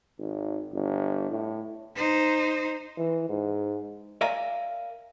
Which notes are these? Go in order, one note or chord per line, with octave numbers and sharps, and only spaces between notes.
G#1
G1
A2
D#4 C5
E3
G#2
A#4 D5 E5 F5 G#5 A#5